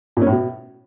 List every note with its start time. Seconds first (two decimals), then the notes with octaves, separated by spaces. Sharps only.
0.17 A#2
0.22 C#4
0.27 A2
0.32 B2